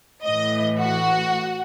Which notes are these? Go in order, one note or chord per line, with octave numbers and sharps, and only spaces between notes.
A2 E3 D#5
F#4